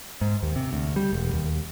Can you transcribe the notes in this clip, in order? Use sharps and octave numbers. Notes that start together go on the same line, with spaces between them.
G#2
D#2
C3
D2
G3
E1
D#2